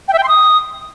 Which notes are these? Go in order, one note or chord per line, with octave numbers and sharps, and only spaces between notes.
G5
E5
G5
C6
D#6